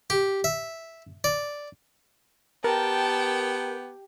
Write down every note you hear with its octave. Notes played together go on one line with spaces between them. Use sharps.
G4
E5
D5
B3 G4 A#4 G5 A5